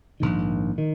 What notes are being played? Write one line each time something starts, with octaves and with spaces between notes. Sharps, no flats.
A#1 G#2 D#3
D#3